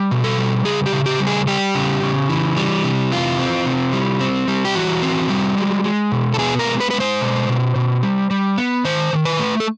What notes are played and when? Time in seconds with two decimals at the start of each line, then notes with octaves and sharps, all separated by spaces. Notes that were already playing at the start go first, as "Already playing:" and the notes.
Already playing: G3
0.11 B2
0.24 A4
0.38 G3
0.65 C#3 G#4
0.86 G4
0.93 C#3
1.06 G4
1.20 G3
1.27 G#4
1.47 G3 G4
1.75 C#3
2.02 C#3
2.29 E3
2.57 G3
2.84 C3
3.12 E3 F4
3.39 C4
3.66 C3
3.93 G3
4.21 C4
4.48 G3
4.65 G4
4.75 E3 F#4
5.02 C4
5.29 G3
5.57 G#3
5.84 G#3
6.12 B2
6.34 A4
6.39 B3 G#4
6.59 A#4
6.66 G#3
6.80 B4
6.91 G#3 B4
7.00 C5
7.21 B2
7.49 B2
7.76 B2
8.03 G3
8.31 G3
8.58 B3
8.85 D#3 C5
9.13 D#3
9.25 B4
9.39 A3
9.60 A4